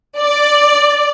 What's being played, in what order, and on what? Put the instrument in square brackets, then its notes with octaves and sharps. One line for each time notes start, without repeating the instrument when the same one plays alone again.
[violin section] D5